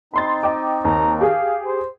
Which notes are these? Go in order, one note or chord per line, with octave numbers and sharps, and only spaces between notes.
C4 D#4 B5 C6 A6
D#5 G5 D6
D#2 A#5
G4 G#4 F5
C5